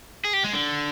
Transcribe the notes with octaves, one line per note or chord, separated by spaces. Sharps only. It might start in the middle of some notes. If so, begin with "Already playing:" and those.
G#4
G4
G#3
D3